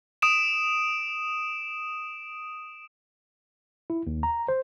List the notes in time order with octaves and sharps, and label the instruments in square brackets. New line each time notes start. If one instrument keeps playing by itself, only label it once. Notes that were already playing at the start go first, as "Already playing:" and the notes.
[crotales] D#6 D7 E7
[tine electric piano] E4
D#2
A#5
C5